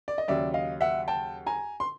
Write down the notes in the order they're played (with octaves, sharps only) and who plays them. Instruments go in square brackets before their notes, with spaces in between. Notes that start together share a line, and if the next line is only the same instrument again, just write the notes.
[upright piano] D5
D#5
D#2 C#3 F#3 D5 E5
D#5 F5
E5 F#5
G5 A5
G#5 A#5
C6